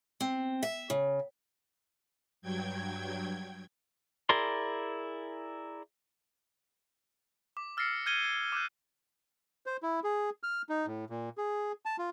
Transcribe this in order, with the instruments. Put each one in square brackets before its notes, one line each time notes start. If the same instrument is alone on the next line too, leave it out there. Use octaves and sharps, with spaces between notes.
[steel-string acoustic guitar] C4
E5
C#3
[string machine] G2 F#3 G5 G#6
[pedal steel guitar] E4 G#4 A#4 D5 C6
[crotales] D6
E6 F6 A6 A#6 C7 C#7
F6 G6 G#6 C#7 D#7 G7
G#6
D6 E6 F#6 G6
[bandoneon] C5
E4
G#4
F6
D#4
A2
A#2
G#4
A5
F4